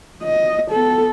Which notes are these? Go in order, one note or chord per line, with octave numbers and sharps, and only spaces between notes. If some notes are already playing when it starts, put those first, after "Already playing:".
D#5
B3 A4